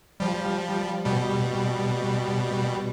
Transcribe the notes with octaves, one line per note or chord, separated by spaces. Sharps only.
F3 G3
B2 G3